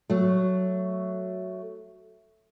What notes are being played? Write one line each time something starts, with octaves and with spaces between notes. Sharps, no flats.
F#3 A3